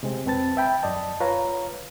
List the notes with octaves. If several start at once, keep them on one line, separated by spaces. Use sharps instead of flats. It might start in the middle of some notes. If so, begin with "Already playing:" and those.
C3 G#3 C4
F2 C4 B4 A5 A6
E5 G5 B5
F#2 D5 D#5 A5
F4 B4 C#5 F5 A#5